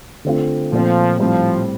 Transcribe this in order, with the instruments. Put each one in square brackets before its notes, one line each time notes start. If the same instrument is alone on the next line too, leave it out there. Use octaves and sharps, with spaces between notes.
[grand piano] D3 A3 C4 F4
[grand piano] A#2 A3 C4 [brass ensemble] F3
[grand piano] A2 G3 C4 [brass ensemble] F3